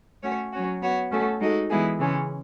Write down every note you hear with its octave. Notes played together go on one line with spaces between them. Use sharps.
A3 C#4 F#4 C#5
F#3 C#4 F#4
B3 F#4 C#5
A3 C#4 F#4 A4
G#3 D#4 F#4 A4 D#5
E3 G#3 B3 E4 G#4
C#3 E3 G#3 C#4